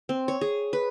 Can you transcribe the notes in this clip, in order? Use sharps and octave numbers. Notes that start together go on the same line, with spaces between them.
C4
C#5
G#4
B4